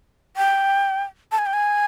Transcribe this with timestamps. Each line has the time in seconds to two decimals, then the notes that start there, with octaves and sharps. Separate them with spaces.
0.37 G5
1.32 A5
1.39 G#5
1.46 G5
1.53 G#5